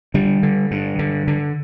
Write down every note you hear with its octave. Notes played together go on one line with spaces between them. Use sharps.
D3 G3
D3
G2
D3
D3